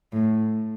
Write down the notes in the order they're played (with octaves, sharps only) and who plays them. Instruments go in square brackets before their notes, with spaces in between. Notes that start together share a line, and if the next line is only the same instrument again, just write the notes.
[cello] A2